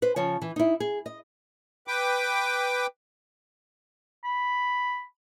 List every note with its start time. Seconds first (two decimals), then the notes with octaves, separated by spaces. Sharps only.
0.02 B4 C5
0.16 C#3 F3 C#5
0.42 E3
0.56 D#4 E4
0.80 G#4
1.06 D#5
1.87 B4 G5 D6
4.24 B5